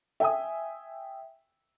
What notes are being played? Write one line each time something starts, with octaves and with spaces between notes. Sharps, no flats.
E5 G5 G#5 D#6